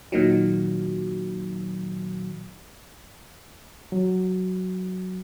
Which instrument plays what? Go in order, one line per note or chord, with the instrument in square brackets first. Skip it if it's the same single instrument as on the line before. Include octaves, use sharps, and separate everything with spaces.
[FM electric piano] A#2 D#3 F#3
[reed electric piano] F#3